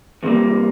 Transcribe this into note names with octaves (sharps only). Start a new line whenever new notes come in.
E2 C3 D#3 G3 A#3